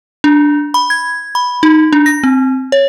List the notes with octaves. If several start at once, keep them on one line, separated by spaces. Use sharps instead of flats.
D4
B5
G#6
B5
D#4
D4
A#6
C4
C#5